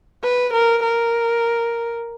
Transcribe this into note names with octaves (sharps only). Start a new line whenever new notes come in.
B4
A#4
A#4